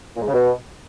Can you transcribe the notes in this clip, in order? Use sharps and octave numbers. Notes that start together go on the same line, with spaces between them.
A#2
G#2
C#3
B2